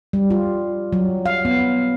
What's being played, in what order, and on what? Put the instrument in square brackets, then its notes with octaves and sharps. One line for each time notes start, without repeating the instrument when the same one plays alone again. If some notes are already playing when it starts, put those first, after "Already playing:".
[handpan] G3
F4
F#3
F5
B3